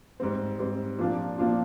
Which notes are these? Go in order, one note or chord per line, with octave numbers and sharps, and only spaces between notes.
G#2 G3 C4
G#2 G3 C4
A#2 F3 A#3 D4 F4
A#2 F3 A#3 D4 F4